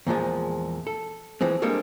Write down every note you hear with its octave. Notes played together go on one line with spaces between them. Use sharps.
E2 A#2 F3 G#3
A4
E3 F3 G#3 C4
G3 G#3 A#3 C4 D4 A4